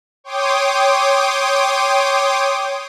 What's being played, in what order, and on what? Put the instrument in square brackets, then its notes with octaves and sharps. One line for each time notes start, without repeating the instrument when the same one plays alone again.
[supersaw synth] C#5 G5 C6 D6 D#6